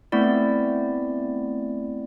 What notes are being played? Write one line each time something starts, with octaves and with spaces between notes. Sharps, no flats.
A3 B3 C4 E4 D5